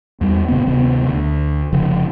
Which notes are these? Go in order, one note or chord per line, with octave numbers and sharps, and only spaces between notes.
E2 G3
G1 A#2 C#3 B3
D1 C3 D#3 B3
D2
F1 C#3 F3